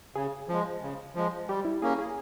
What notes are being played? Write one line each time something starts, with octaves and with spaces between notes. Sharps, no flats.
C#3 G#4
F3 G#3
C#3
F3 G#3
G3 G4
E4
A#3 C#4 G#4
G#4